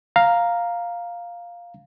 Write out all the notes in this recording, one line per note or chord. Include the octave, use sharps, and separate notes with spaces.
F5 A#5